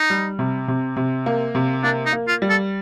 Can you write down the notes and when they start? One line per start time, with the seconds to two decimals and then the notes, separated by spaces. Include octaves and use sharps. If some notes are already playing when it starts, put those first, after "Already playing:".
Already playing: D#4
0.10 G3
0.39 C3
0.68 C3
0.97 C3
1.26 A#3
1.55 C3
1.83 A#3 D4
2.06 D#4
2.13 A#3
2.28 F4
2.42 G3
2.50 A4